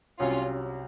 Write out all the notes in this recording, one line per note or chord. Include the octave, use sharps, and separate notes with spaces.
C2 C3 F#3 C#4 F4